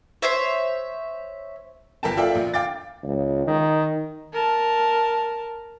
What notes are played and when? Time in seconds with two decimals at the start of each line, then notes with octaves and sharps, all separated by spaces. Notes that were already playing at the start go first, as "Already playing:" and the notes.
0.22 C5 C#5 E5
2.03 G1 A#4 G5 A5
2.17 F4 A4 D5 E5 G5
2.35 A#1
2.54 F5 G5 D6 A6
3.03 C#2
3.47 D#3
4.33 A#4 A5